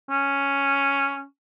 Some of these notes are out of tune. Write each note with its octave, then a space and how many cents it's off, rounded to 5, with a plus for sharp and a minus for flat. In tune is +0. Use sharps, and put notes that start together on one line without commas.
C#4 +0